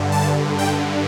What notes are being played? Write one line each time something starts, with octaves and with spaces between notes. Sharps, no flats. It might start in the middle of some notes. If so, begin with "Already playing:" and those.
Already playing: G2 D3
A5
G5